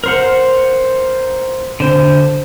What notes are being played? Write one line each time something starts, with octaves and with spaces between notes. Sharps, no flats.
A#4 C5 F#5
D3 C5